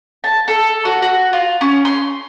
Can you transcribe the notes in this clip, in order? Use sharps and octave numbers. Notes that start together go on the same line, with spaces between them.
A5
A4
F#4
F#4
F4
C#4
C6